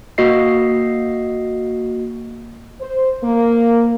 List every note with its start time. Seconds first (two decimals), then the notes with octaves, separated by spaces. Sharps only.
0.18 A#3 F#4 D#5 C7
2.81 C5
3.23 A#3